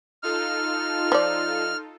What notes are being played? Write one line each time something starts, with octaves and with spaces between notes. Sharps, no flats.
D#4 F4 A4 F6
F3 D5